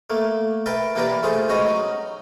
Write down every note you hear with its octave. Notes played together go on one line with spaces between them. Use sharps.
A3 A#3
A#4 B4 E5 F5 G5 A5
E3 A#3 G4 A#4 B4 D5
A3 F4 G#4 C5
G#2 C#4 F#4 B4 D#5 D#6
F#3 D#4